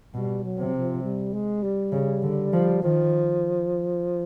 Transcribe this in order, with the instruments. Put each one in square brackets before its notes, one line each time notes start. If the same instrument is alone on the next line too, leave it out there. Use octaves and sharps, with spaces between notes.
[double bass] B2 [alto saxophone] G3
[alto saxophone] F#3
[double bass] C3
[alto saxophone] F3
G3
G#3
G3
[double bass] C#3
D3
F3
[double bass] D#3 [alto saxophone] F3